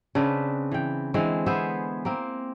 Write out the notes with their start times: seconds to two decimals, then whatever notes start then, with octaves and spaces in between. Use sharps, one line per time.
0.15 C#3 C4 D4 B4
0.72 E3 G5
1.14 D3 E3 G#3 C4
1.46 B3 G#4 C5 E5
2.05 A#3 C4